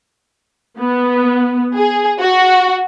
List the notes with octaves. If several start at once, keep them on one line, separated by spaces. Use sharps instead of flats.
B3
G#4
F#4